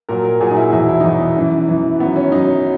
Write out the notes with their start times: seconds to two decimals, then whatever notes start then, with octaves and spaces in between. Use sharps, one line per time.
0.09 A#2 F#3 A#4
0.24 A#4
0.40 A#2 F#3 G#4
0.51 D#4
0.56 E4
0.72 E2 B2 F#3 E4
0.88 E4
1.00 D#4
1.04 E2 B2 F#3 E4
1.20 B3
1.36 F#2 E3
1.68 F#2 E3
2.00 F#2 D#3 F#3 B3
2.16 C#4
2.32 F#2 D#3 F#3 D#4